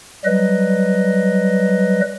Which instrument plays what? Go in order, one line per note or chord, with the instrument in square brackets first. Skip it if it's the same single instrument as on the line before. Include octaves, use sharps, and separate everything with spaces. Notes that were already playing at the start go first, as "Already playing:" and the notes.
[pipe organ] F#3 G3 B4 D#5